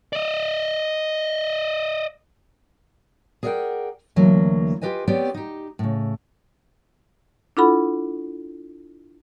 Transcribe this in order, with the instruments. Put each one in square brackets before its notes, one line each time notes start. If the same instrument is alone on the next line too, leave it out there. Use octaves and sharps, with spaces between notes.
[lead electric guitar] D5 D#5
[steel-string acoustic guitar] G#4 A#4 D5 D#5 F#5 G5
D2 E3 F#3 A#3
F4 G4 B4 D#5 G#5
B3 C4 G4 C#5 D5 G5
D#4 G4
A2 C#3
[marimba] D4 E4 F4 A4 F#5 B5